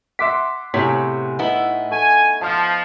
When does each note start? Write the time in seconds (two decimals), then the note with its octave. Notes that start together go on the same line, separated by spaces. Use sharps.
0.19 E5 F#5 C6 D6 B6
0.74 A2 C3 B3 E4 G#4 C#5 B6
1.39 B3 D#4 E4
1.91 A3 G#5
2.41 F3 A5 F6